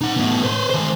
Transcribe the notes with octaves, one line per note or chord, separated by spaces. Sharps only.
D#4 F#5
A2 B3
B4 C5
D#3 C5